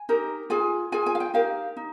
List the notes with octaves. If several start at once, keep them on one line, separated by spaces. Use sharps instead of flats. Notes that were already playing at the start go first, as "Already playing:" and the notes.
Already playing: G#5
D#4 G4 A#4
F4 G#4 G#5
F4 G#4 G#5
G#5
F5
G5
D#4 G4 A#4 F5
D#4